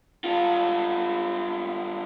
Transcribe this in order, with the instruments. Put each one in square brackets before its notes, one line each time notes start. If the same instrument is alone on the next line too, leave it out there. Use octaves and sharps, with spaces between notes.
[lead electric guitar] G2 F4